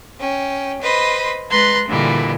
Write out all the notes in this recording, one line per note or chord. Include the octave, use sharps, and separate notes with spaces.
C#4 G5
B4 C5 D#5 B5 C6
G#3 B4 A#5 C6 F#6 A6
A#2 D3 E3 G3 G#3